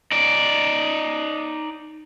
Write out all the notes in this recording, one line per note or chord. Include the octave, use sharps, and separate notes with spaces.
D#4 D5